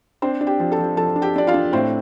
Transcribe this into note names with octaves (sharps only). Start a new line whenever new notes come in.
C4 D4 C5
D4
G4 G5
F3
A4 A5
F3
F3 A4 A5
D4
G4 G5
D4 D5
F4 F5
D4
A2 C4 C5